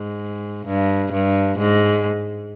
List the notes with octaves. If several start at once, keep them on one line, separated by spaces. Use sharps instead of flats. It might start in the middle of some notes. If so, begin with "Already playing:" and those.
Already playing: G#2
G2
G2
G#2